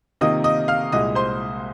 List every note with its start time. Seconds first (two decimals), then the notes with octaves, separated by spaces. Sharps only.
0.21 C3 D#3 A#3 F4 D#5 D#6
0.44 D#5 D#6
0.68 F5 F6
0.92 C2 A#2 G#3 D#5 D#6
1.15 C5 C6